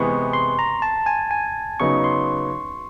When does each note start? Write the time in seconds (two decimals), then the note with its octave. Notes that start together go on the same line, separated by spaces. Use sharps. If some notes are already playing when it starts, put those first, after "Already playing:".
Already playing: C3 E3 G#3 B3 C#6
0.33 C6
0.59 A#5
0.82 A5
1.06 G#5
1.31 G#5
1.80 C#3 F#3 B3 D#4 C#6
2.04 C6